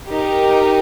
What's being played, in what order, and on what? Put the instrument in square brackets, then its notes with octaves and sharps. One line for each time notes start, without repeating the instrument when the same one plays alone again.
[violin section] D#4 G4 A#4